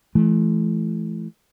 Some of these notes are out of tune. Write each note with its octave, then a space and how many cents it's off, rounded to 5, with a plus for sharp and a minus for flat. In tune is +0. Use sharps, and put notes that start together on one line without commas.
E3 +20 A3 -35